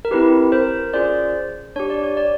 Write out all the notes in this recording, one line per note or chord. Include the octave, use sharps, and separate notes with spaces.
A#4
C4 E4 G4 B4
A#4 C5
C#4 F4 G#4 C5 D5
D4 G4 C#5
D5
C#5
D5